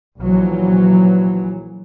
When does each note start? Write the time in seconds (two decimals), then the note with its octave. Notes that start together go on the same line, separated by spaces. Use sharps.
0.20 A#1 E3 F#3